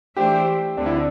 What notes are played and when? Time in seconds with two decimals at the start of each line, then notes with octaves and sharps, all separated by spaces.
0.17 E3 A3 D4 G4 C5 E5
0.77 D2 D3 C4 D4
0.86 E4
0.95 D4